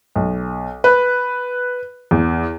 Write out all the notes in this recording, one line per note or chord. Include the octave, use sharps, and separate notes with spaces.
B1
B4
E2